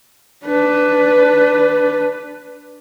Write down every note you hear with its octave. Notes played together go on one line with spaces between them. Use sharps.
D4 B4